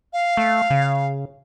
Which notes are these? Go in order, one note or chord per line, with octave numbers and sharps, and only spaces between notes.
F5
A3
C#3